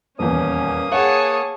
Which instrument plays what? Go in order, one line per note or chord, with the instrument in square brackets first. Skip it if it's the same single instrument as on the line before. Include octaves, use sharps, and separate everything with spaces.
[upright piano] D#1 E2 [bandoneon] A#3 D#6 [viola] C#4
[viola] G#4 [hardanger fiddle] C#5 A5 [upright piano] F#5